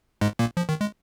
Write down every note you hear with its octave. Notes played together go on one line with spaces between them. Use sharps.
G#2 G#3
A#2 A#3
F3
D#3
G#3